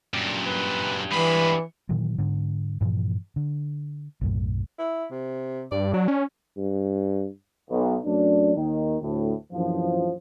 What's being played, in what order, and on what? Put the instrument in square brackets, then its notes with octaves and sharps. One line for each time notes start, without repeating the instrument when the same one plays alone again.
[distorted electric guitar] F#2 A#2 [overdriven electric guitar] D4 G4
[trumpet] B4
[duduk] E3 [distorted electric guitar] G#3 B3 [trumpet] B5
[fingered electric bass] A#2 D#3 E3 F#3
G#2 D3
G2 A#2 E3 F3
D3
B1 F#2 A2
[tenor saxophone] E4
C3
[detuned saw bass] G2 [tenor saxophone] D5
[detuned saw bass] F#3 [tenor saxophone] D4
[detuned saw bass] C#4
[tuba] G2
[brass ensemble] B1
F#2 F#3 A3 D4
D#2 D#3
D2 A2
A#1 F#2 E3 F3